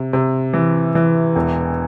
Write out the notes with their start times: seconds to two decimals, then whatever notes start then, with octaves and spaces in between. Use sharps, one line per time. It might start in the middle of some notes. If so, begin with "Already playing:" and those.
Already playing: C3
0.13 C3
0.53 E3
0.95 E3
1.36 E1